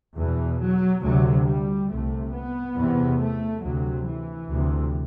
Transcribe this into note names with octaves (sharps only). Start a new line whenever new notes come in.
E2 B2 E3
F#3
D2 C3 F#3
G3
C2 C3 A3
B3
E2 C3
A3
D2 C3 F#3
E3
D2 C3